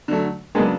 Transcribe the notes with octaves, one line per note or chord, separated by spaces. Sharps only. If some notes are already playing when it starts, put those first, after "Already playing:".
D3 F#3 A3
C#3 F#3 G#3 A#3 B3 D4